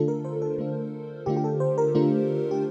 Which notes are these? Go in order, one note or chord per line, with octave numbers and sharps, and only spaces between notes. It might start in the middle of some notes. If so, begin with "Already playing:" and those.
Already playing: D3 A3 D4 F4 A4
A#4
C5
A4
D3 A3 D4 F4
D3 A3 D4 F4 G4
G4
A4
C5
A#4
D3 A3 D4 F4
G4